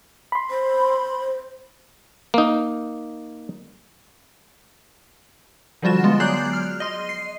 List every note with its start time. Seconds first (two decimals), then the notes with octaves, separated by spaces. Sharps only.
0.32 B5 C6
0.50 C5
2.34 A#3 D#4
5.82 D3 F3 G3 F4 F#4 E7
6.04 G#3 B3 F4
6.20 F#3 G#4 D5 F#6 G6 C7
6.53 F6
6.80 D#5 C6
7.09 C7